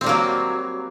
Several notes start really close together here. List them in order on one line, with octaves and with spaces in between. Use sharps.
C4 G3 A#3 F#3